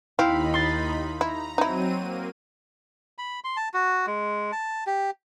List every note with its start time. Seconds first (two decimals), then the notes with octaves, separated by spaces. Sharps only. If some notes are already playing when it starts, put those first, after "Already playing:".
0.19 D#2 C4 D#4 E4 F5 B5
0.54 C6 A6
1.21 E4 A#5
1.58 F#3 C4 D#4 E4 D#7
1.98 A#3
3.18 B5
3.44 C6
3.57 A5
3.74 F#4
4.07 G#3
4.52 A5
4.87 G4